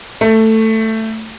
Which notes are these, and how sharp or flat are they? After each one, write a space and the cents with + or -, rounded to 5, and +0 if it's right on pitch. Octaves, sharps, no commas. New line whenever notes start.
A3 +10